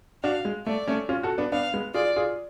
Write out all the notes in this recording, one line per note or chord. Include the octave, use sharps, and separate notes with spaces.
D4 F#4 F5
G#3
A3 D5
A3 C#4
C#4 F4
F#4 A4
B3 D4
B3 D4 F5
G#3 B3
F4 G#4 D5
F4 G#4